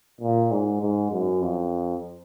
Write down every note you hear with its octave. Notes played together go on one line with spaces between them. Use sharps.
A#2
G#2
G#2
F#2
F2